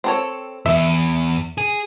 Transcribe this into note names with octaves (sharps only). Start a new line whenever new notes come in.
C4 A4 C#5
E2 E5
G#4